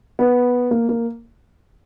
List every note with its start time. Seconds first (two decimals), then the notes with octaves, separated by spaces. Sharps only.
0.19 B3
0.71 A#3
0.89 A#3